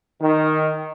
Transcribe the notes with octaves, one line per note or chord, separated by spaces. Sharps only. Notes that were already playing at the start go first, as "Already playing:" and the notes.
D#3